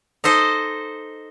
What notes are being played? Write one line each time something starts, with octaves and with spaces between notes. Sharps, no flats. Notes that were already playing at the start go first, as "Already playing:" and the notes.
D#4 A4 C5 D#5